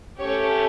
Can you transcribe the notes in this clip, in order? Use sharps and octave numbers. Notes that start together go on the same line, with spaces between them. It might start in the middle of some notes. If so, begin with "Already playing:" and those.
A3 C#4 G4 C#5